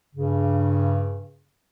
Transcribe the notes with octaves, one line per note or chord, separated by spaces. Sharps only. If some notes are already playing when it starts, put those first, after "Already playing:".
G2 C#3